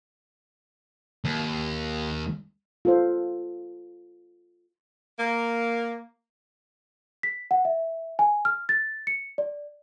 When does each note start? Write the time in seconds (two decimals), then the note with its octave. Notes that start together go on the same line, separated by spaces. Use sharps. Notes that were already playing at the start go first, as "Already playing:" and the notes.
1.25 D#2
2.85 F4 A4 C5
5.19 A#3
7.23 B6
7.51 F#5
7.65 E5
8.19 G#5
8.45 F6
8.69 A6
9.07 C#7
9.38 D5